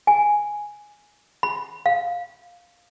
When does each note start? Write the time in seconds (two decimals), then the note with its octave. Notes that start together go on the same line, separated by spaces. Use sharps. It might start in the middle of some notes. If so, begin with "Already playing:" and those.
0.07 G#5
1.43 B5
1.86 F5